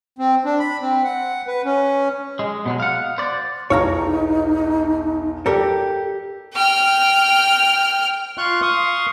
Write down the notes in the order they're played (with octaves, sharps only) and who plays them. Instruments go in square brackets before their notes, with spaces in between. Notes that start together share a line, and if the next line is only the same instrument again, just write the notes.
[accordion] C4
D4
B5
C4
F#5
B4
C#4
[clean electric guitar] G#3
B2 F#3 G#3
F5 F#5
C5 D5
[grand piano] B1 E2 [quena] D#4 [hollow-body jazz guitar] C#5 F5 A#5
[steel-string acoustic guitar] G4 [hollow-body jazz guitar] A4 A#4 D5
[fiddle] G5 F6
[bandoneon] F4 F5 C6 C#6 F#6
F5 C6 C#6 D#6